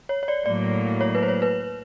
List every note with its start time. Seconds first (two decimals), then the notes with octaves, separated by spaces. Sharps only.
0.09 C#5
0.23 C#5
0.28 D5
0.46 A2 F#3 A#3 D5
1.01 C#5
1.15 B4
1.22 C5
1.28 C#5
1.42 B4